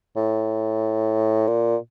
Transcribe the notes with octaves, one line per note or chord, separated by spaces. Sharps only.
A2
A#2